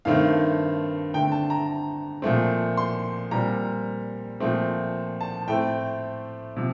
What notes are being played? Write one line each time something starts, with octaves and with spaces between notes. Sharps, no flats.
G2 D#3 A3 C4 F5
D3 A3 C4 G5
A5
A#5
A#2 F3 A3 C4
C6
A#2 G3 C4 A#5
A#2 F3 A3 C4
A5
A2 A3 C4 G5
C3 F3